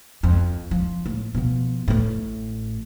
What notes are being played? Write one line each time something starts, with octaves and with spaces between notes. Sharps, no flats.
F2
F3
A2
B2 F3
A1 A2